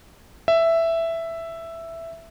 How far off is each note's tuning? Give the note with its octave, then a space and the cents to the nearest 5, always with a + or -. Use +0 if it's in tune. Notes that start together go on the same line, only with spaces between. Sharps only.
E5 +5